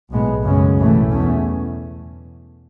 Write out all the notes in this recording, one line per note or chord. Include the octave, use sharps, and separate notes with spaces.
B1 A2 G#3 B3
F#2 C#3 G#3 C#4
B1 A2 E3 A3
E2 B2 A3 C#4